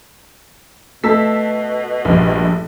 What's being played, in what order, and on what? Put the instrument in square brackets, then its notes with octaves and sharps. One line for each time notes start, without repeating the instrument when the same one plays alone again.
[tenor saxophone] B2 [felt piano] A3 [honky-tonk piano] A5 E6 B6
[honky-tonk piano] A#1 G2